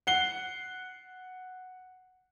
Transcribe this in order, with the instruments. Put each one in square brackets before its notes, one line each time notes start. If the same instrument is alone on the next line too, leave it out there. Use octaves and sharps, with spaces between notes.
[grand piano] F#5 C7 G7